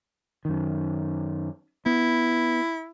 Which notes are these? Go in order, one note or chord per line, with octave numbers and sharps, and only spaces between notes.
F#2 D#3
B3 E4